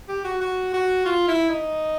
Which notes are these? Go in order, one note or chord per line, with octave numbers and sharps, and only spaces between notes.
G4
F#4
F#4
F#4
F4
E4
D#4